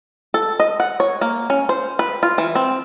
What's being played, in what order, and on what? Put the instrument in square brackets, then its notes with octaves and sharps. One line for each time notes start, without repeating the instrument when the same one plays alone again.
[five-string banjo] A4
D#5
F#5
C#5
A#3
C#4
C5
B4
F4
E3
C4